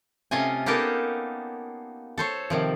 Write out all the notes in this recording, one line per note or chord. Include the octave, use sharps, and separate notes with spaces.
C3 A3 C#4 F4 D#5 G#5
A#3 B3 D#4 G4 A4 A#4
A4 C5 C#5
C3 D#3 F3